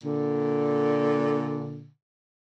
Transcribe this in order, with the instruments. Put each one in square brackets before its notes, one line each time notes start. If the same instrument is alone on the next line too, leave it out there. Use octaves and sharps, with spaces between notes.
[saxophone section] A#2 D3